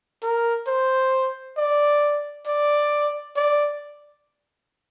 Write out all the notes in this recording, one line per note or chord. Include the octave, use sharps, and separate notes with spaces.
A#4
C5
D5
D5
D5